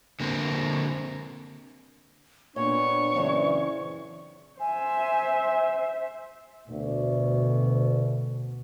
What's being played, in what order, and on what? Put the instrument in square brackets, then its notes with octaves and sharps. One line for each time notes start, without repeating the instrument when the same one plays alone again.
[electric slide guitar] D3 A#3 C4
[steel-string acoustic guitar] A#2 [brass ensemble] B3 C4 D4 [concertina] C#5 [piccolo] C#6
[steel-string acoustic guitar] F#2 C4 D4 [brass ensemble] A#2 C#3 E3
[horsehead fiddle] C5 E5 [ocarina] G#5
[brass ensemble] D2 [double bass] B2